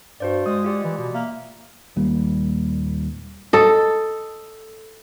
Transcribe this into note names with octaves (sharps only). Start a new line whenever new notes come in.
G2 F#4 C5 D5
G#3 D#6
F4 G4 D5
E3
B2
A#3 E5
D#1 G3 A#3
A4 D#5